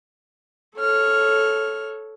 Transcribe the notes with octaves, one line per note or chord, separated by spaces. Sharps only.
A4 C#5 F6